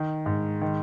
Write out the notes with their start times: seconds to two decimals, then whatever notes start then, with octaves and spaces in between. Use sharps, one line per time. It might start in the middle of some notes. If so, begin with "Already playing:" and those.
Already playing: D#3
0.26 G#2
0.62 D#3